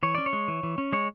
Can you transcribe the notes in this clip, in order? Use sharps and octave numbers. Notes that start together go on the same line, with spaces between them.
E3 C#5
C#4 D5
C#5
G#3
E3
E3
C#4
G#3 C#5